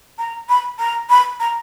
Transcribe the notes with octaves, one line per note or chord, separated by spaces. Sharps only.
A#5
B5
A#5
B5
A#5